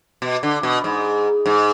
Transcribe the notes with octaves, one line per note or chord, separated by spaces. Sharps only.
B2
D3
B2
G#2
G#2